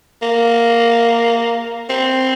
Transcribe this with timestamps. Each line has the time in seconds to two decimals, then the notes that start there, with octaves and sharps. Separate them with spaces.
0.22 A#3
1.90 C4